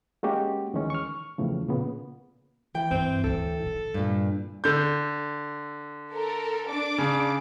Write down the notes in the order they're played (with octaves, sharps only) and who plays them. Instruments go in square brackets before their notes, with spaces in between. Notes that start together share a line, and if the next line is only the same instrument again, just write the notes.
[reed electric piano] G#3 A#3 C#4 F#4 G4
D2 D#3 E3 G#3 C#4
C#6 F6
E2 A2 C#3 E3 F3
A#2 C#3 B3
[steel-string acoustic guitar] E3 G5
[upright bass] G2 [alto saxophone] C4
[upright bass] D2 A2 [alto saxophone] A4
[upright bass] D#3 E4
[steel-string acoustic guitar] G2 A#2
[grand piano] D3 G6
[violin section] A4 A#4
D4 D6
[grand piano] C#3